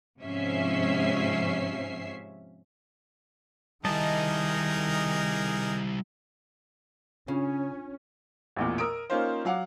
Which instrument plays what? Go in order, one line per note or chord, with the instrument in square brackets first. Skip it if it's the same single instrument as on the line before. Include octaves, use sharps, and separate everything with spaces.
[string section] G#2 C3 F3 C#4 E5 C7
[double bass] D#3 [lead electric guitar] G3 E4 [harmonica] D#4 G#4 A#4 [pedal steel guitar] D#5 A5
[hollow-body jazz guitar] C#3 [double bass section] C#4 [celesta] D4 F4
[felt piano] A1 E2 A#2
A#4 D#6 E6 D7
A#3 C#4 D#4 F4 A#4 C5
F#3 F5 F#5 D6